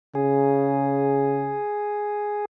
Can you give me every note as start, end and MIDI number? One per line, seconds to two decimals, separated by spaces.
0.15 1.59 49
0.15 2.45 68